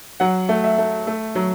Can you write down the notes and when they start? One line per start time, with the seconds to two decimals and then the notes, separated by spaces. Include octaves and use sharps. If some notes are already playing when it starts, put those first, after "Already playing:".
0.20 F#3 F#5
0.49 A3
0.64 E5
0.78 A3
1.07 A3
1.35 F#3